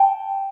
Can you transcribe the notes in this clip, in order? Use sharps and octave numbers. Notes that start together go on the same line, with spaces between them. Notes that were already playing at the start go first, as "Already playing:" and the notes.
Already playing: G5 A5